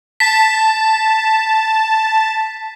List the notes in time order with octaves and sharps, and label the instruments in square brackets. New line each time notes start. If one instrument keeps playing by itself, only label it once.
[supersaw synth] A5 [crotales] B6